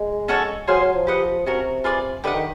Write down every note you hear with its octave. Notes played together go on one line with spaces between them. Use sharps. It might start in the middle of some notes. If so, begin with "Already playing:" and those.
Already playing: G#3
C#4 F#4 A4 C#5
F#3 G#4 C5 F5 G#5
F#3
F3
G4 B4 D#5 F#5
C3 C#4 F#4 A#4
F4 G#4 B4 D5
D3 G4 B4 D#5 F#5
D#3